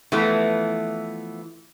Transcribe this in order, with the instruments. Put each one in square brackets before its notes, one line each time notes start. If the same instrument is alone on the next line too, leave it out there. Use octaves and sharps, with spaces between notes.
[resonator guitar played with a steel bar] E3 F3 A3 B3